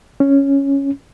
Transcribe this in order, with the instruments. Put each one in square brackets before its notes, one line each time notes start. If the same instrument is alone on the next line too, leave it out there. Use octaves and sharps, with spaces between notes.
[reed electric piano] C#4